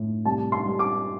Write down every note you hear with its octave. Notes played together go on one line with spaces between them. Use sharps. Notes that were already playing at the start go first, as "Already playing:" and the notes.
Already playing: A2
C2 A5
C6
G3
D6